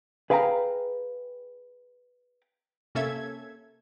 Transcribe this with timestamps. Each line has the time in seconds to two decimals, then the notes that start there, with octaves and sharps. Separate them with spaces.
0.30 G#4 B4 F5 G5 G#5 A#5
2.95 C3 A#3 C#4 A4 E5 G#6